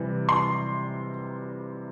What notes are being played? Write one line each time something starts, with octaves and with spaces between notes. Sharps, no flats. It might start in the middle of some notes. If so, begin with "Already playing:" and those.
Already playing: C3 E3 G3
C6